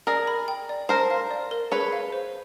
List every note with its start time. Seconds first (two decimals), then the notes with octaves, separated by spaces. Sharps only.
0.07 G#4 A#4 D5
0.27 B5
0.48 G5
0.69 D5
0.89 A#4 C5 A5
1.10 F5
1.31 D5
1.51 A#4
1.71 G#4 B4 C#5
1.92 F5
2.13 C5